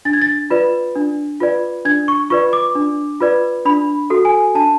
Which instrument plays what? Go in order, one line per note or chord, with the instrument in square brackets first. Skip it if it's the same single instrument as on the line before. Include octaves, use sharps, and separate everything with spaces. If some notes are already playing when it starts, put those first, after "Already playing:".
[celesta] D4 A6
G#6
A6
F4 B4 D5
D4
F4 B4 D5
D4 G#6
C#6
F4 B4 D5 C#6
D6
D4
F4 B4 D5
D4 B5
F#4 A4
G#5
D4 A5